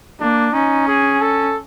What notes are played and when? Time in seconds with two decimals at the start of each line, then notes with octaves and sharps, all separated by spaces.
0.20 A#3 D4
0.53 C#4 D#4
0.87 G#4
1.22 A4